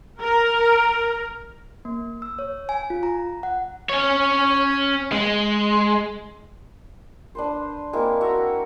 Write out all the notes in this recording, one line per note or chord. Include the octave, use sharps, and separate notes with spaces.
A#4
A#3
E6
C#5
G#5
F4
A#5
F#5
C#4 C#5
G#3
D4 B4 C5
G#3 A#3 C4 E4
F#4 E5 A#5